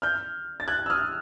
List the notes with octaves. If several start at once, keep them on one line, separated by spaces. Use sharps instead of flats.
F6 G6
A6
F#6 G#6
E6
D#6 F6